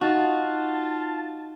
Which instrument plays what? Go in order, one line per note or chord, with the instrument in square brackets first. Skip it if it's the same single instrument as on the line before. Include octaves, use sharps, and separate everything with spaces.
[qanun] D#4 [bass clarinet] F4 [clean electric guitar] F#4 [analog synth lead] A5